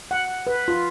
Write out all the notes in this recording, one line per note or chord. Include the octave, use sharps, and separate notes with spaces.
F#5
B4
F4